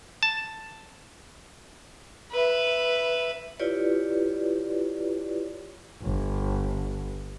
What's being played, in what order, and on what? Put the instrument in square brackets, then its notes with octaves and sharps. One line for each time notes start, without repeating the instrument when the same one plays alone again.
[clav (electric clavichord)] A5
[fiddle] B4 E5
[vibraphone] E4 F4 G4 B4 C#5 D5
[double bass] G1